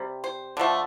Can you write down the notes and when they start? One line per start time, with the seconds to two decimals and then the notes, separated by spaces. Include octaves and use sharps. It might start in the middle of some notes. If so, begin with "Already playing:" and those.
Already playing: C3 G3
0.24 C5
0.57 D3 F3 A3